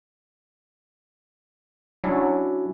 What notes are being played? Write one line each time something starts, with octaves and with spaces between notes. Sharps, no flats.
F#3 C#4 D4 E4